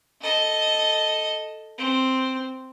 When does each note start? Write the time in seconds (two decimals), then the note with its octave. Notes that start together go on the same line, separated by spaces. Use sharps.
0.22 A4 D#5
1.78 C4